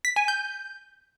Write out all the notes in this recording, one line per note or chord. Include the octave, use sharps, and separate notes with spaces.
B6
G#5
G6